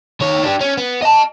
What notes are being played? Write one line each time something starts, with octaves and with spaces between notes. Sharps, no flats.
D#3 C#5
D4 G4
C#4
B3
D#5 A5